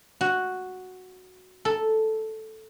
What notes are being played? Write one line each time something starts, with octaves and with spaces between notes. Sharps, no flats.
F#4
A4